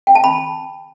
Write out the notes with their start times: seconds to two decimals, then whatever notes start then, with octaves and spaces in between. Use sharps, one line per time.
0.07 G5
0.15 A5
0.24 B5